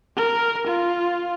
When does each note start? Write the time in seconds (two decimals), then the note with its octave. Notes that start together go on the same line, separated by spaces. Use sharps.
0.17 A#4
0.67 F4